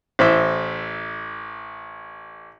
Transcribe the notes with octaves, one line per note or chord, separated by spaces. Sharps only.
A1 C5 E5